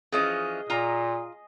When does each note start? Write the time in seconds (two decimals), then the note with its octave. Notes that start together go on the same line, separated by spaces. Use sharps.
0.12 E3 F3 C#4 G#4 D#5
0.70 A#2 F4 A#5